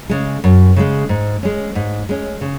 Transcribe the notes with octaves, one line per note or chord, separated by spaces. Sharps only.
C#3 G#3
F#2
C#3 G#3
G#2
G#3 C#4
G#2
G#3 C#4
C#3